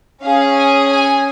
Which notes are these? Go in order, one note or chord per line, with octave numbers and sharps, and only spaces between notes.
C#4 G#4 F5
G#5
G#5